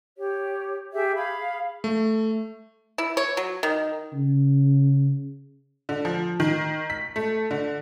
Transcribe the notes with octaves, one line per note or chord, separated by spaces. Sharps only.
G4 C#5
G4 G#4 E5
G#4 F5 B5
A3
E4
C#5
F#3
D#3
C#3
D3
F3
D#3
B6
A3
D3